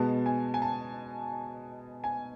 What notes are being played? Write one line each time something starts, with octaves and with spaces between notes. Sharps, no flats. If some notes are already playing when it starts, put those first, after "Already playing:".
Already playing: B2 G#3 B3 A5
G#5
G#5
A5
G#5